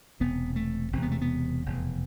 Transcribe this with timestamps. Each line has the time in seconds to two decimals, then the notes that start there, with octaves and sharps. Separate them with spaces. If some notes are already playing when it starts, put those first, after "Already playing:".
0.20 E1 E2 C3 B3
0.56 A3
0.92 E1 E2 C3 C4
1.02 B3
1.12 A3
1.22 B3
1.66 F1 E2 B2